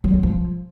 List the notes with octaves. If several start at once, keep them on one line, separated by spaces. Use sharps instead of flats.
F#3
C4
F3